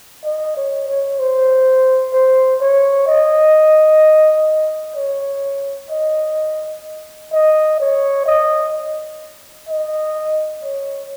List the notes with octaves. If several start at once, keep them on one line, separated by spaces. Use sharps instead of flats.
D#5
C#5
C#5
C5
C5
C#5
D#5
C#5
D#5
D#5
C#5
D#5
D#5
C#5